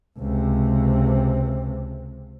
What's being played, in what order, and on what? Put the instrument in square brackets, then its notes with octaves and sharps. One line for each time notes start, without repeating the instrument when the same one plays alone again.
[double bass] C#2 C3